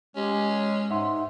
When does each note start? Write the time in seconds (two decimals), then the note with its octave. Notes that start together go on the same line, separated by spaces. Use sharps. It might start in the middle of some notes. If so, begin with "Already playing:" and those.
0.16 G#3 C#4 G4
0.91 G#2 D#4 E5 F#5 C6